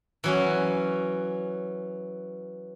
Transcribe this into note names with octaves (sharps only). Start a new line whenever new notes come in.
E3 F#3 C#4